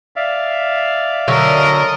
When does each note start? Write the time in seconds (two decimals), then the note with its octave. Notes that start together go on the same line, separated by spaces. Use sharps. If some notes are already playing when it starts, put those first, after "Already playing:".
0.16 D5 E5 F5
1.28 D3 F#3 A#4 D#5